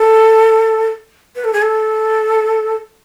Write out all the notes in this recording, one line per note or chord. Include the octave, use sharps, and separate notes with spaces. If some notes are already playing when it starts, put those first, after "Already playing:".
Already playing: A4
B4
A4
G#4
A4